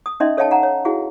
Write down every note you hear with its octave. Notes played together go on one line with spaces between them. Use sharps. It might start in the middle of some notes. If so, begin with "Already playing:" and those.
D#6
C#4 D#4 D#5 E5 C6
A4 C#5 D#5 F5 G5 A5
F#5 A5 A#5
C#5
E4 F#4 G#4 F5